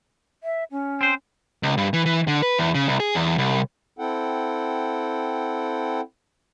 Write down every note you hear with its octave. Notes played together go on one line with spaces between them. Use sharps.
E5
C#4
C4 C5
C#2
G2
E3
E3
D3
B4
E2
C#3
C2
G#4
E2
C2
C4 E4 A4 F#5 G5